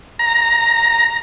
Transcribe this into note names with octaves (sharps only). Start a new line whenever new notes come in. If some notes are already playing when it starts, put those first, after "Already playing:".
A#5